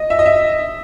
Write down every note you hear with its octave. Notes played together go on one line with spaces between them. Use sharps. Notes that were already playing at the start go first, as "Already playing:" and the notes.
Already playing: D#5
E5
D#5
E5